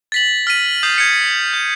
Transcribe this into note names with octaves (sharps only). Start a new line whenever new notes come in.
A6 B6 F#7
F6 B6 D#7
D#6 G6 C7
G#6 C#7
G6